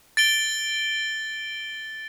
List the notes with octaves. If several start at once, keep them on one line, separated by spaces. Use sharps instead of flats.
A6 D7 G7